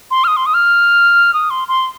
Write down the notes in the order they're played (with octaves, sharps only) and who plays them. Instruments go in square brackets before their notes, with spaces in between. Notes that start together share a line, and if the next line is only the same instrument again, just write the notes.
[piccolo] C6
F6
D#6
C6
D#6
F6
D#6
C6
C6